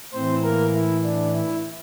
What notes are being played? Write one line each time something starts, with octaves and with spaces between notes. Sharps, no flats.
A2 E3 C4 C5
A#3 A#4
E4
D4
E4